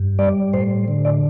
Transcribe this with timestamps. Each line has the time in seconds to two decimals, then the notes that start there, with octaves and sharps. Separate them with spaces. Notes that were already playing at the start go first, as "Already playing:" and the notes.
Already playing: G2
0.19 G3 D5
0.53 A2 C5
0.88 D3
1.05 D5